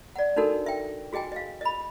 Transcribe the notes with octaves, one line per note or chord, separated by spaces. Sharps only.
D5 F#5
D4 D#4 F#4 A4 A#4
E5 G5
F#4 G#4 D#5 G5 G#5
D#5 F5
D#5 B5